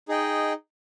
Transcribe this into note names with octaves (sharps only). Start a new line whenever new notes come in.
D#4 G#4 D#5 G5